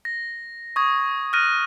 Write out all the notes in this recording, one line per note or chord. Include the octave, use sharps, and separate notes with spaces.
A#6
C#6 D#6 G#6
F6 F#6 A#6 D#7